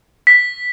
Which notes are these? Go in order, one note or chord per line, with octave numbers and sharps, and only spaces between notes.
B6